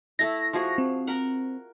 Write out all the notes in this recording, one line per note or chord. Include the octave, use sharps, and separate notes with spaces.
A3 E4 A#6
F3 F#4 G#4
C4
A#4 F#5